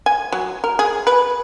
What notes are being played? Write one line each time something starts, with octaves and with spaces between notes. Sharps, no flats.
G#5
F#3
A#4
G#4
B4